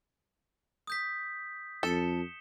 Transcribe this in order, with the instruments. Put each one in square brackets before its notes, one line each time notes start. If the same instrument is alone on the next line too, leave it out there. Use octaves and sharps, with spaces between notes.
[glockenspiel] D#6 G6 B6
[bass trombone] F2 [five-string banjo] A4 [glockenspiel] C#7 E7 G7